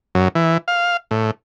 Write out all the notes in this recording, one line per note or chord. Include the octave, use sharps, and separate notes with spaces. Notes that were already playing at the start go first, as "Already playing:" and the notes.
F#2
E3
F5
A2